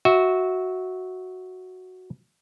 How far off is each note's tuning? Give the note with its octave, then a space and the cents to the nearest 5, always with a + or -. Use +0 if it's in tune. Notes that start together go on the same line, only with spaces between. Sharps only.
F#4 +0 E5 -20